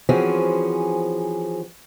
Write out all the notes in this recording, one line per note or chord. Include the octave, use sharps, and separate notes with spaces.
E3 F3 C4 C#4 F#4 G#4